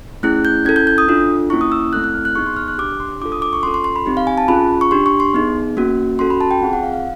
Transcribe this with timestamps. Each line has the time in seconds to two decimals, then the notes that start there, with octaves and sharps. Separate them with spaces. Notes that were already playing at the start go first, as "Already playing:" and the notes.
0.23 A3 C#4 E4 G#4 F#6
0.45 G6
0.65 C#4 E4 A4 G#6
0.76 G6
0.87 G6
0.98 D#6
1.08 D4 F4 A4
1.50 A#3 C#4 E4 C#6
1.61 D#6
1.72 E6
1.93 A3 C4 E4 A4 F#6
2.04 F#6
2.14 F6
2.25 F#6
2.35 B3 D#4 G#4 C#6
2.46 C6
2.57 F6
2.68 F#6
2.78 D4 G4 D6
3.00 C6
3.21 D4 F4 A4 D6
3.32 D#6
3.42 D6
3.53 C#6
3.63 C#4 F4 A4 C6
3.74 C6
3.84 C6
3.96 B5
4.06 C4 D#4 G4
4.17 F5
4.27 G#5
4.38 A5
4.48 C#4 F4 G#4 B5
4.81 C#6
4.91 D4 G4 C6
5.06 C#6
5.20 C6
5.34 B3 D#4 G#4
5.77 A#3 C#4 F#4
6.19 C#4 F#4 A4 C6
6.30 B5
6.41 A5
6.51 G5
6.61 C4 F4 G#4 F#5
6.73 F#5
6.83 F5
6.94 F5